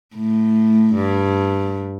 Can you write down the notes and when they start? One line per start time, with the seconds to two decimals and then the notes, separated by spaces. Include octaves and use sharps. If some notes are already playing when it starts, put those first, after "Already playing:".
0.15 A2
0.94 G2